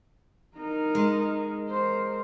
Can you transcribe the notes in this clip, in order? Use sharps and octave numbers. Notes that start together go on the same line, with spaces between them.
D#4 A#4
G#3
A#4 C5